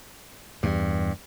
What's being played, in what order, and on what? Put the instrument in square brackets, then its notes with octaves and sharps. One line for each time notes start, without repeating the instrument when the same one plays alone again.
[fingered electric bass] E2 [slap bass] G2